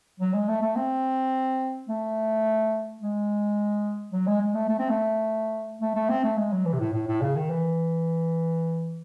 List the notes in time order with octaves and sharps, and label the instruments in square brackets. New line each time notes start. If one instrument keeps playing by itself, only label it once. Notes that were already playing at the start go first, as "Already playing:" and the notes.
[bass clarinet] F#3
G#3
A3
A3
C4
A3
G#3
F#3
G#3
G#3
A3
A3
C4
A3
A3
A3
C4
A3
G#3
F#3
E3
C3
A2
A2
A2
C#3
D#3
E3